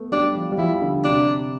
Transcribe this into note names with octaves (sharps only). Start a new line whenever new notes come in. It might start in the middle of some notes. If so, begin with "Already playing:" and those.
Already playing: A3 B3
G3 D4
F3
G3
F3 E4
D3
C3 D4